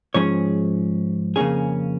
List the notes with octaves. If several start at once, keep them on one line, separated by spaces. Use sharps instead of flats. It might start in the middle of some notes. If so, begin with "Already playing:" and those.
G#2 F3 C#4 G#4 C#5
F2 C#3 A#3 C#4 G#4